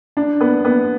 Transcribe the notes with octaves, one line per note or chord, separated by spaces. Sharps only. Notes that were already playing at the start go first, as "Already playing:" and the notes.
D4
B3
B3